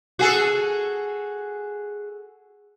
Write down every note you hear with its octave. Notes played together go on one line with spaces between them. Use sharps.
F#4 G#4 A4